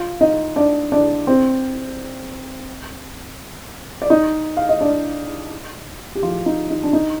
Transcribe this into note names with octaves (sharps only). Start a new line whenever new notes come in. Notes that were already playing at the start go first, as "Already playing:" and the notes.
Already playing: F4 F5
D#4 D#5
D4 D5
D4 D5
C4 C5
D5
D#4 D#5
F5
D#5
D4 D5
G4
F3 F4
D#4
D#4
D4
D#4